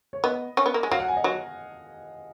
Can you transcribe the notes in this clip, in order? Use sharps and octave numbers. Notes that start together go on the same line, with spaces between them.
C#5
B3 D#5
C#4
B3
A#3
G#3
F#3 F5
F#5
G#5
D#5
F#3